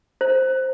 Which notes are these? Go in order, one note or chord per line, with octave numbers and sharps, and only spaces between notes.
C5